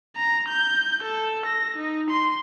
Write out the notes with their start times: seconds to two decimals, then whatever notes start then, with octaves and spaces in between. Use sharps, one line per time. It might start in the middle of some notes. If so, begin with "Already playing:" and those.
0.16 A#5
0.48 G6
1.03 A4
1.45 A#6
1.76 D#4
2.10 C6